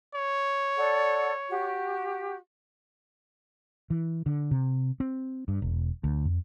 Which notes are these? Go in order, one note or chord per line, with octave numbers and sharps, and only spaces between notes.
C#5
A4 D5 F#5
F#4 G4
E3
D3
C3
C4
G2
E1
D2
F2